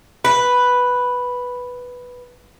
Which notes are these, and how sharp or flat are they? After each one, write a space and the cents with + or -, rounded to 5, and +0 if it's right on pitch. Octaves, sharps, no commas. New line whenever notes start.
B4 +0